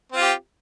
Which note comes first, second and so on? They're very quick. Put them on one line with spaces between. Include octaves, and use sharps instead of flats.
C4 F4 G4